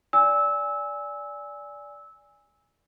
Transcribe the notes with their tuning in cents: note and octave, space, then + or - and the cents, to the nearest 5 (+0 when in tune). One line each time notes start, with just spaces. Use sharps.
D5 -10 G#5 -10 E6 -20